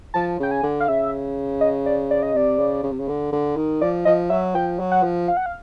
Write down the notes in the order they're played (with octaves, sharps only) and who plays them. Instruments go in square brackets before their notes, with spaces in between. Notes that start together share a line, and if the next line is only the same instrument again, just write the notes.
[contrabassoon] F3 [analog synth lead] A5
[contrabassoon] C#3 [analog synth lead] G5
[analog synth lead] G#5
[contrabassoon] D3
[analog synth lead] F5
[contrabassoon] C#3 [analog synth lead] E5
[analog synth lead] D#5
D5
D5
D#5
[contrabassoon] C3 [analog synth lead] D5
[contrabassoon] C#3
C#3
C3
C#3
D3
D3
D#3
[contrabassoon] F3 [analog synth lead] D5
[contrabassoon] F3 [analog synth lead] D#5
[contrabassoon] F#3 [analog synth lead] E5
[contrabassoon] F3 [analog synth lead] G5
[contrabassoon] F#3
[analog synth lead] F#5
[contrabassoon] F3
[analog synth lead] F5
F#5
F5